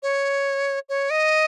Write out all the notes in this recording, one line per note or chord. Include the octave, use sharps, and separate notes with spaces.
C#5
C#5
D#5